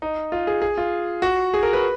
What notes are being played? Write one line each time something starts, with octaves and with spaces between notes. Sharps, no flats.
D#4
F4
G#4
G#4
F4
F#4
G#4
A#4
B4